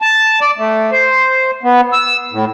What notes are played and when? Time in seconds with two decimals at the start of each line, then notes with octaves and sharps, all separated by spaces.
0.02 A5
0.41 D5
0.58 A3
0.92 C5
1.63 B3
1.93 E6
2.32 A2